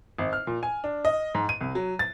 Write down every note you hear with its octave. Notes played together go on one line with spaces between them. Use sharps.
G#1
F6
A#2
G#5
D4
D#5
G#2
D#7
C2
F#3
A6